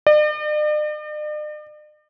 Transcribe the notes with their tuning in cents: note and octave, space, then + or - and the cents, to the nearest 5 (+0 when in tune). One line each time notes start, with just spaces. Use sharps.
D5 +45